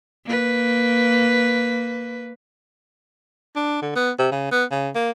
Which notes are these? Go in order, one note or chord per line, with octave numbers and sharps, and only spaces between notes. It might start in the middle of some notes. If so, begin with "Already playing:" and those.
A#3 B4
D4
D3
B3
C3
C#3
B3
C#3
A#3